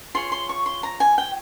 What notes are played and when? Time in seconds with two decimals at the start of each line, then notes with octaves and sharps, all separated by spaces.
0.14 F4 G#4 C#5 C6
0.32 C6
0.49 C#6
0.66 C6
0.83 A#5
1.00 G#5
1.18 G5